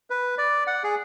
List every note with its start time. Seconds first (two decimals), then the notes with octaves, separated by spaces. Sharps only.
0.10 B4
0.38 D5
0.67 F#5
0.84 G#4